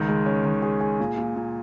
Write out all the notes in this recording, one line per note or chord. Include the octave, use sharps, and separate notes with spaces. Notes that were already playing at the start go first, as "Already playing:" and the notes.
Already playing: C#2 D#3
G#3
C#4
D#3
G#4
G#4
A#2
A#2
A#2